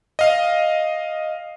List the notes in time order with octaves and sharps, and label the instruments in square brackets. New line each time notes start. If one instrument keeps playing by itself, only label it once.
[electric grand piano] D#5 F5